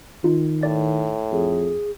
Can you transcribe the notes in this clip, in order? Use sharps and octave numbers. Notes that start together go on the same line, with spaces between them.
D#3 D#4 F4
A2 D5 A6
F2 G#4